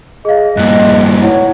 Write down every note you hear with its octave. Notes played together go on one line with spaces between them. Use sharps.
G#4 D#5 F5
G2 A#2 F#6
E4 C#5 F#5